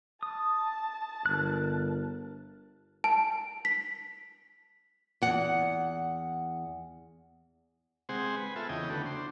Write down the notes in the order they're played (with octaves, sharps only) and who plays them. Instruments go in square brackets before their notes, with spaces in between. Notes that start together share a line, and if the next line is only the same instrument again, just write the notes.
[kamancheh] A5 [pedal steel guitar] D#6
[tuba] G1 [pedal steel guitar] A#4 F#6
[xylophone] A5
B6
[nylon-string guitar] E2 F#5
[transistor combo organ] C3 G#3 C4 G#4 C5 F#5
B4 G#5
B3 F4 A4 E5
E2 C#3 D#5 G5
D3 A3 B3 F#4
D4 C5